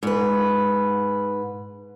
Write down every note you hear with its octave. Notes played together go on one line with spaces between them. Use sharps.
G#2 B4